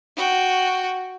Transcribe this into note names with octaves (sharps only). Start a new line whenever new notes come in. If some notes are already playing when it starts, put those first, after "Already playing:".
F#4 G5